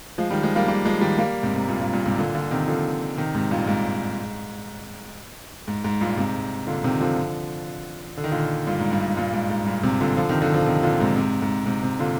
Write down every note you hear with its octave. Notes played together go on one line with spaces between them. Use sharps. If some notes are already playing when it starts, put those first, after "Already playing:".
F3 G#3
D#3 G3
F3 G#3
G3 A#3
G3 A#3
F3 G#3
D#3 G3
G3 A#3
G#2 C3
G#2 C3
G2 A#2
G2 A#2
G2 A#2
G#2 C3
A#2 D3
A#2 D3
C3 D#3
D3 F3
C3 D#3
G#2 C3
G2 A#2
G#2
G#2
G#2
G2 A#2
G#2 C3
A#2 D3
C3 D#3
D3 F3
D3
D#3
A#2 D3
G2 A#2
G#2
G2
G#2
G2 A#2
G#2
G#2
G2 A#2
G#2 C3
A#2 D3
D3 F3
C3 D#3
D3 F3
D3 F3
C3 D#3
A#2 D3
G#2 C3
G#2 C3
G#2
G#2 C3
G#2 C3
A#2 D3